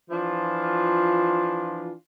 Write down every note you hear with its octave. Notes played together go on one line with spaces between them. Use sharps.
E3 F3 D4 F4